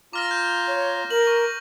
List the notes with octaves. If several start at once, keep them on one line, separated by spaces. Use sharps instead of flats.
F4 A#5 D6 F6 A#6
G6
C#5
A#4 F#7
C#6